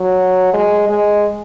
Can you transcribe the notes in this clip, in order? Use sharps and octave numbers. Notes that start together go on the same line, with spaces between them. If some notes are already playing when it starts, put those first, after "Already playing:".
Already playing: F#3
G#3
G#3